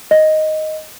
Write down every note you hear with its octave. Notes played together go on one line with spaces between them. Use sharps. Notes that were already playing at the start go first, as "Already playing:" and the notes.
D#5